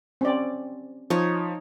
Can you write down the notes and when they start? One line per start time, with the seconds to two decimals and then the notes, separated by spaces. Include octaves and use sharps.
0.21 C4 C#4 D5
1.10 F3 D#4 C#5